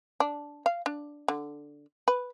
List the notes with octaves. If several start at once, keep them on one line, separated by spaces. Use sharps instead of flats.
D4
F5
D4
D3
B4